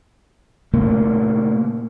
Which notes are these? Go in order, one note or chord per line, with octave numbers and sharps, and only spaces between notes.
A#2 C#3 A3 A#3